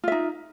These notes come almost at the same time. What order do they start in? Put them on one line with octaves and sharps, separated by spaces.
F4 E5 D#4